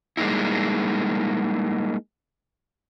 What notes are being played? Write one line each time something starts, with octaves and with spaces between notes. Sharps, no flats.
G3 G#3 A#3 D#4 E4